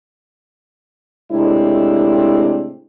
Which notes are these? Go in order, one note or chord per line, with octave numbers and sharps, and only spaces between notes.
A2 C3 G#3 C4 D4 E4